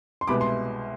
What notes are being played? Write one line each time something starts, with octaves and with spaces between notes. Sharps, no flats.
C6
C2 B2 G#3 B3 B5 D6
C6